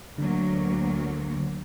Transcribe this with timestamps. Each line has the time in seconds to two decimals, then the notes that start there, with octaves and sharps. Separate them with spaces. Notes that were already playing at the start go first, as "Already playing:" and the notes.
0.18 D2 D3 F#3 A#3